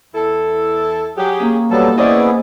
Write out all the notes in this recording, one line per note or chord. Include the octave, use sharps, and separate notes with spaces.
E2 E4 A4
F#3 G4 G#4
A#3 C#4
B2 F#3 G3 B3 A4
B3 C#4 E4 G#4 C5 D5 D#5 G#5